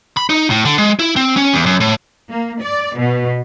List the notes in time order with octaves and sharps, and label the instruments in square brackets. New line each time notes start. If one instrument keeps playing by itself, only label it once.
[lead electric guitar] B5
D#4
A2
D3
G#3
E4
C4
C#4
E2
F#2
A2
[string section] A#3
D5
B2